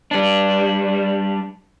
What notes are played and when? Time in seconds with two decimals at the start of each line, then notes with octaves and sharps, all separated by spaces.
0.11 G3 D4